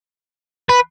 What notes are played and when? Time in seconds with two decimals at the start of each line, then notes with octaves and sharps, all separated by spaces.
0.69 B4